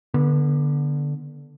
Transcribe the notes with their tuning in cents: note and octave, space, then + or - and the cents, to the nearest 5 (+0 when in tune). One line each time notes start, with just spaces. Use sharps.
D3 +0 B3 -30